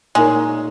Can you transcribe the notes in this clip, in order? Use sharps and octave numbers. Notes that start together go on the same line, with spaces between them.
A#2 G#3 A#3 D#4 A#4 C#5